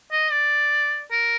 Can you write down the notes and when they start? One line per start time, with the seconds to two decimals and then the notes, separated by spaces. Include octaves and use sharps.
0.12 D#5
0.31 D5
1.12 A#4